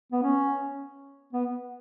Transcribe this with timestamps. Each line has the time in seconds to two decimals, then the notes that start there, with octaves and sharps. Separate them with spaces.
0.12 B3
0.23 C#4
1.33 B3